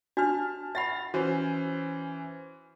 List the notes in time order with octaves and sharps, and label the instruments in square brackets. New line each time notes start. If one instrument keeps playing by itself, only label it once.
[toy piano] D4 F#4 [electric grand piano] A5 F6
[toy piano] E5 F#5 B5 [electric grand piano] A6
[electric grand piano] E3 C#4 C5 [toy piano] F#4